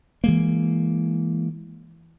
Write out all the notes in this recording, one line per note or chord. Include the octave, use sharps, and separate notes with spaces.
E3 G#3 A#3